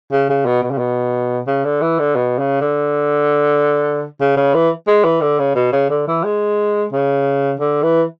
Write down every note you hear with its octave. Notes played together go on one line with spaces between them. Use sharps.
C#3
C#3
B2
B2
C#3
B2
C#3
D3
E3
D3
B2
C#3
D3
C#3
C#3
E3
G#3
E3
D3
C#3
B2
C#3
D3
E3
G#3
C#3
D3
E3